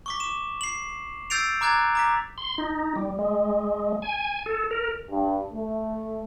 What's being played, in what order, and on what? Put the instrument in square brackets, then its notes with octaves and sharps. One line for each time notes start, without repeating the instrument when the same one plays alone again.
[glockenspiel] C#6 D6 B6
D6 E7
C7 F#7
E6 G6 A6 C7 D7 F7
A#5 D6 F#6 G#6 A6
A#5 D6 B6
[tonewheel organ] C6
D#4
G3
G#3
G#5
A4
A#4
[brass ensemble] G2
A3